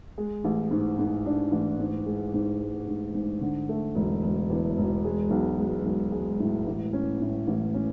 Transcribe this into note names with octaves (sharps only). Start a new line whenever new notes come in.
G#3
A1
G#2
G#2
D4
A1
G#2
G#3
G#2
G#3
G#2
G#2
D3
A3
E1
E1
E2
E1
G#3
B1
G#3
B1
G#3
A2
A1
C#4
A2
A1
C#4